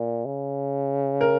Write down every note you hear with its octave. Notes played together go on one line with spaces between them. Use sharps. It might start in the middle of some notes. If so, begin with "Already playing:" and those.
Already playing: A#2
C#3
A#4